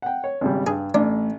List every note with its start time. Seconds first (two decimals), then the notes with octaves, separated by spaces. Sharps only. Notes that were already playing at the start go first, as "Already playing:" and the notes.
0.02 F#5 G5
0.24 C#5
0.41 G#1 C#3 G3
0.67 G2 G#4
0.94 A1 A3 D4